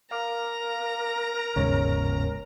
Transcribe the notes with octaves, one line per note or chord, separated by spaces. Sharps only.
A#4 F5 A#5 D6 F6
G1 D#2 G#2 C#3 C#5